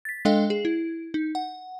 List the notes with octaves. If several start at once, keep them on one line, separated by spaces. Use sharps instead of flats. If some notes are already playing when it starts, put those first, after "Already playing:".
A6 B6
G#3 D4 A4 D#5 F5 G5
G#4
E4
D#4
F#5